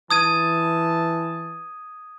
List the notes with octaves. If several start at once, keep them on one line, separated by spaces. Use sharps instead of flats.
E3 A5 D#6 G#6 D#7